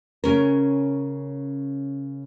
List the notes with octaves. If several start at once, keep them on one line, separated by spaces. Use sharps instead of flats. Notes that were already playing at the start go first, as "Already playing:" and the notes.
C#3 C#4 A#4